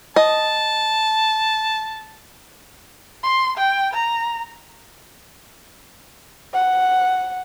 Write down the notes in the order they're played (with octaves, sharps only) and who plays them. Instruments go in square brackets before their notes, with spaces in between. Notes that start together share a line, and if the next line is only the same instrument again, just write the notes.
[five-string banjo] D#5 [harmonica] A5
[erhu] C6
G5
A#5
[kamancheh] F#5